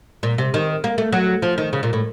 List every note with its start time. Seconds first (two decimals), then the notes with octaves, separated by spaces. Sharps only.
0.23 A#2
0.38 C3
0.54 D#3
0.84 A#3
0.98 A3
1.13 F#3
1.42 F3
1.58 D#3
1.73 C#3
1.83 A#2
1.93 A2